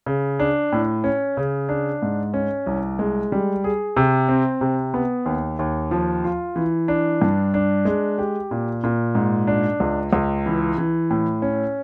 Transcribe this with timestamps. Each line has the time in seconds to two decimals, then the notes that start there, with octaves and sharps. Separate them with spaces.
0.06 C#3
0.39 D4
0.72 A2
1.04 C#4
1.37 C#3
1.69 D4
2.02 G#2
2.34 C#4
2.67 C2
2.99 G#3
3.32 G3
3.64 G#4
3.97 C3
4.28 C4
4.61 C3
4.94 B3
5.26 D#2
5.59 D#2
5.91 F3
6.24 F4
6.56 E3
6.88 D4
7.22 G2
7.54 D4
7.85 G#3
8.18 G4
8.51 A#2
8.84 A#2
9.15 G#2
9.47 D4
9.80 C#2
10.13 C#2
10.46 E3
10.78 E3
11.10 A2
11.42 C#4